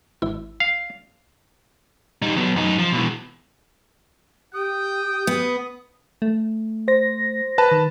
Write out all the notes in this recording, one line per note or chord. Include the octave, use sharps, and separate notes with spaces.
G#1 E4
F5
G3 D#4
F#3 B3
F#2 D#4
F3
B2 E3
G4 G5 D#6
B3
A3
C5 A#6
B4 A5
D#3